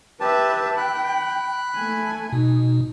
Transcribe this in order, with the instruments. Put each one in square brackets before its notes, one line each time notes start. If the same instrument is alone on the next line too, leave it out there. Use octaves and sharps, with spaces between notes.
[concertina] G4 A5 [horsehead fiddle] B4 E5
[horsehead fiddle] G5 [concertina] B5 F#6
[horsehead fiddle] A3 G#5
[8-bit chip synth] B2 [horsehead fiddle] D#4